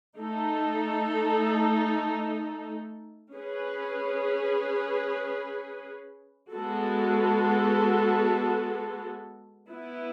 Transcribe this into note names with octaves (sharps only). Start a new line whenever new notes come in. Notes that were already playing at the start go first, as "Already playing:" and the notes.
A3 D#4 A4
C#4 G#4 B4
G#3 B3 F#4 A4
B3 E4 B4